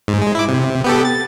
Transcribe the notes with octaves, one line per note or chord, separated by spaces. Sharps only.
G#2
G#3
E4 D6
C3
B3 G4 A4
A6